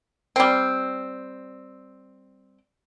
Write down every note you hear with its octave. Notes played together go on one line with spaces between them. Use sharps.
G3 C4